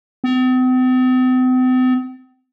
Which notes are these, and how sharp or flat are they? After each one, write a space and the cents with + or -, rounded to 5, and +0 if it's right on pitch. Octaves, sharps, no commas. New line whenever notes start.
C4 -45